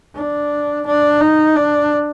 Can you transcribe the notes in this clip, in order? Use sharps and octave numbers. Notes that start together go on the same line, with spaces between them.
D4
D4
D#4
D4